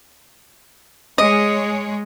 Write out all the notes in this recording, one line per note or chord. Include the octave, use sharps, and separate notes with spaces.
G#3 C#5 D#5